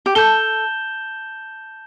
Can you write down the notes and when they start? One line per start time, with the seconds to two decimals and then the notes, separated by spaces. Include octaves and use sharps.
0.06 G4
0.15 A4 A5 G6 E7 G7